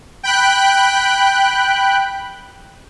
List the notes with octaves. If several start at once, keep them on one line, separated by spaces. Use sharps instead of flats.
G5 B5 F#6